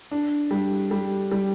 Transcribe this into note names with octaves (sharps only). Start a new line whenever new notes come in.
D4
G3
G3
G3